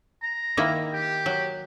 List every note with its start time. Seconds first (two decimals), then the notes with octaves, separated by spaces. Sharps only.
0.22 A#5
0.57 D#3 A#3 E4
0.93 G4
1.26 F#3